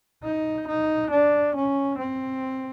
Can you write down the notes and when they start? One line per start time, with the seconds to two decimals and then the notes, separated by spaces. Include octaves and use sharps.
0.24 D#4
0.68 D#4
1.11 D4
1.55 C#4
1.98 C4